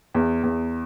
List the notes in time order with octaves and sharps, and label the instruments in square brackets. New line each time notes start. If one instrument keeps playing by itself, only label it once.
[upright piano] E2
E2